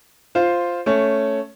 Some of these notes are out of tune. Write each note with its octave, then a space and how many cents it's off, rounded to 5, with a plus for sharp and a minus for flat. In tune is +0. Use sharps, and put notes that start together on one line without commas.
F4 +0 C5 +0 F5 +0
A3 +0 C#4 +0